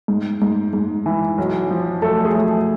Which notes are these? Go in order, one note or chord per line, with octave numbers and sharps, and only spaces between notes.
G#2
G#2
G#2
E3
B1
F3
B1 A3 A4
G#4
B1 A3 A4